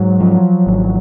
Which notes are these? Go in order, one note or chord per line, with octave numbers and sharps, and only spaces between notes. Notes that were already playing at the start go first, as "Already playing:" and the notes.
Already playing: G#2 F#3
F3
G#1